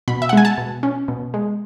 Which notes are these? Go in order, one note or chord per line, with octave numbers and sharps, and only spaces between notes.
B2 B5
E5
F#5
G#3 G#5
A5
B2
C#4
B2
G#3